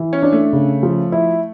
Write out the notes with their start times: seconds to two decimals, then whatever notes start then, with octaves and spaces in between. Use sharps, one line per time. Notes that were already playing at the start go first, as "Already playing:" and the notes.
Already playing: E3
0.13 C#4
0.23 D4
0.32 A3
0.53 C#3
0.83 F3
1.12 E4